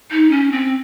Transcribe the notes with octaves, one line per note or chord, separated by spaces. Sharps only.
D#4
C#4
C4